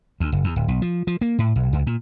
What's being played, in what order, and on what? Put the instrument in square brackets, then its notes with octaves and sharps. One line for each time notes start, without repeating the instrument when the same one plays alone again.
[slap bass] D2
F#1
E2
D1
B1
F3
F3
A#3
A2
B1
C#2
A#2